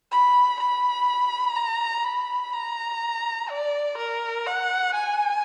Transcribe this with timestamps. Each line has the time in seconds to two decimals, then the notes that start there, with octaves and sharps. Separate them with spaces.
0.11 B5
0.60 B5
1.56 A#5
2.05 B5
2.53 A#5
3.50 D5
3.98 A#4
4.46 F#5
4.94 G#5